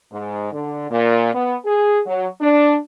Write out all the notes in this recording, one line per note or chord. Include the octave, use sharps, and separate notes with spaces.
G#2
D3
A#2
B3
G#4
F#3
D4